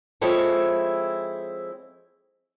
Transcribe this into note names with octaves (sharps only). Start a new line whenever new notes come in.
F3 G#3 C4 E4 A4 C#5